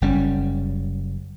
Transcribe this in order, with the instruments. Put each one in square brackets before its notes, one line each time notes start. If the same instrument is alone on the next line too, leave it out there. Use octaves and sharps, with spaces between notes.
[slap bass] F#1 G3 C#4